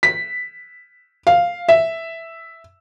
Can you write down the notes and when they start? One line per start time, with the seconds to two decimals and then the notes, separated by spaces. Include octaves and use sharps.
0.03 B6
1.27 F5
1.68 E5